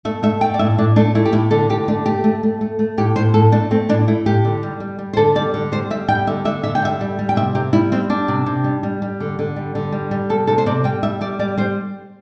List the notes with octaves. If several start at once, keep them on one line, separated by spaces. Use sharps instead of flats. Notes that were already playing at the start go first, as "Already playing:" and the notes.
A3 E5
A3 E5
A3 G5
D5
A2 E5
A2 D4
A3 D4
A3 E4
G4
A2 E4
D3 A4
D3 G4
A3 D4
A3 G4
A3
A3
A3
A3
A2 G4
A2 C5
A2 A4
A3 D4
A3 C4
A2 D4
A3 E4
A2 G4
D3
G3
G3
G3
C5
D3 A4
G3 D5
D3
G3 C5
G3 E5
G3 G5
D3 E5
D3 E5
D3 E5
G5
G3 E5
G3
G3
G5
C3 E5
C3 G4
G3 E4
G3 C4
G3 D4
C3
C3
G3
G3
G3
D3
D3
G3
D3
G3
G3
C3 A4
C3 A4
C5
C3 D5
G3 G5
G3 E5
G3 D5
G3 D5
G3 C5